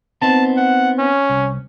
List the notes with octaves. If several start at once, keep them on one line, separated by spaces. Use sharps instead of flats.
B3 C4 D#4 A5
F#5
C#4
C2